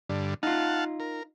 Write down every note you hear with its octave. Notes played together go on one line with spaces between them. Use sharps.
G2 D3
D#4 F4 F5 F#5 A5
A#4